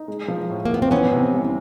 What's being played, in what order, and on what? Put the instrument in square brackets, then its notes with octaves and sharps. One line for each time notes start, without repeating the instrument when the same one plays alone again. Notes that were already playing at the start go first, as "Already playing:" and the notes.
Already playing: [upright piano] D#4
G#3
F3
A2
[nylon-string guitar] A#3
[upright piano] A2 [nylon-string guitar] B3
[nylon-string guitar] C4
[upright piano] E3 [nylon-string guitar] B3 C#4
[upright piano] C3
C2